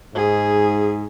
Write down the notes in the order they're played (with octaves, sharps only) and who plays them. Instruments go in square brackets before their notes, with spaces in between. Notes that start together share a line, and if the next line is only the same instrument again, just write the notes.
[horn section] G#2 [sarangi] G#4